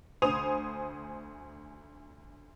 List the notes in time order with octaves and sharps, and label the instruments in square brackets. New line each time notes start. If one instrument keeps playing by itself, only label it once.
[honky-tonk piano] D2 C5 G#5 B5 D#6 F7